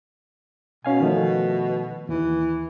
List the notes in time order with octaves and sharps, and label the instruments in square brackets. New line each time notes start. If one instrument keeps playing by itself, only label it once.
[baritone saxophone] B2 [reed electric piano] C#4 F5 G#5
[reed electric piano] D#3 F3 A3
[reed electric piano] D#2 [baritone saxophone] E3